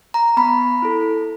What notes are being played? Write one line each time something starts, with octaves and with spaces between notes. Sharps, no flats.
A#5
B3 B5
E4 A4